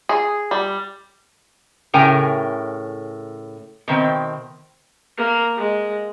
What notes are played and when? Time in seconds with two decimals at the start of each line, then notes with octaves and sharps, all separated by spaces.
0.09 G#4
0.51 G3
1.94 A2 C#3 A#4 G5 G#5
3.88 B2 D#3 C4
5.17 A#3
5.57 G#3